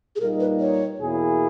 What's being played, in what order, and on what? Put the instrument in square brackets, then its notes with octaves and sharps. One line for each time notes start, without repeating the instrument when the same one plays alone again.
[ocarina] G#4
[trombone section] A#2 G3 A#3 D#4 [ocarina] A#4
[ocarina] B4
C#5
[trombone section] E2 B2 A#3 E4 G#4